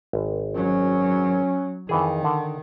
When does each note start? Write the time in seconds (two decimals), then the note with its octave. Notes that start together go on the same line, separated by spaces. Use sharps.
0.13 G#1
0.55 F#3 C#4
1.89 F2 D#3 E3 G#4
2.24 D3